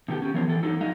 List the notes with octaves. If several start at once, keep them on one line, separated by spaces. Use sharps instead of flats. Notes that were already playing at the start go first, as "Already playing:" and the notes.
C3 D#3 B3 G4 A4
C#4 G4
E3 F3 B3 A#4 C5 C#5
E3 A4
G2 F#3 D#4 A4
F2 G3 D#4 D#5 F5